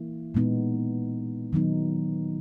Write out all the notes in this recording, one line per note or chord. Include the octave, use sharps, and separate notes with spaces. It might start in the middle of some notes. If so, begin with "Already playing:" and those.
Already playing: E3 A#3 E4
A#2 G#3 B3 D#4
D#3 F#3 B3 D#4